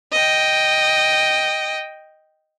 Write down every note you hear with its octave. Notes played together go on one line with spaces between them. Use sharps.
D#5 G5